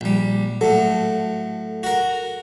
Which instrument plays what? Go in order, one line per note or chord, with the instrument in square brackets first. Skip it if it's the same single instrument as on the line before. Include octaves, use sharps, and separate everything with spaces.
[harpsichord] A#1 G3
[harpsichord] A2 F#3 [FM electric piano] A4
[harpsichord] F#4 A#4